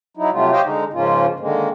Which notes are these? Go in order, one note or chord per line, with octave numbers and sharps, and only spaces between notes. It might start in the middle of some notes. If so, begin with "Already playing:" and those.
F#3 D#4 E4
C3 F#3 G3 A3 F4
G4 C5 C#5 D#5 F5 G5
D3 G#3 D#4
G#2 C#3 F3 A#3 C#4 F4
D3 D#3 G#3 A#3